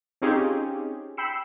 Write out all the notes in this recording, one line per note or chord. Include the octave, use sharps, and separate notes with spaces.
C4 C#4 D#4 F4 G4 G#4
G5 B5 E6 C7 C#7 E7